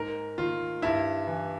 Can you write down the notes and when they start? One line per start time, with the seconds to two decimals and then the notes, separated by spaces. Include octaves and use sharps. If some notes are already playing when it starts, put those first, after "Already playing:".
Already playing: G#2 A#4
0.38 D#3 F4
0.82 G2 E4
1.27 E3